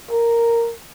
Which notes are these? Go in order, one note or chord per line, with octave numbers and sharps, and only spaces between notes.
A#4